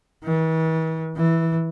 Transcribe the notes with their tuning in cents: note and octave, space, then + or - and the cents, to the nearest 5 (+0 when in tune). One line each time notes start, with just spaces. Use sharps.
E3 -40
E3 -5